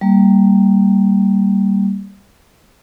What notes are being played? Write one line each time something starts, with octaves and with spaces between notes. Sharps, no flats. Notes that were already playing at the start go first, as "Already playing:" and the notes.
G3 A#3